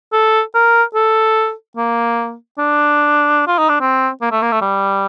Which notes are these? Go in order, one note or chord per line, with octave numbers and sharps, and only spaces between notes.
A4
A#4
A4
A#3
D4
F4
D#4
D4
C4
A#3
A3
A#3
A3
G3